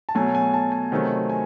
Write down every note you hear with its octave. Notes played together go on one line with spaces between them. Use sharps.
A5
B2 F#3 A3 G#5
G#5
A5
G#5
C3 D#3 F#3 A3 C4
G#5